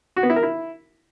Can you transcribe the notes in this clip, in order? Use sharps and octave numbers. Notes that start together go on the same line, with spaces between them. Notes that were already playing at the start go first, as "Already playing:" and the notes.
F#4
B3
E4
A#4
E4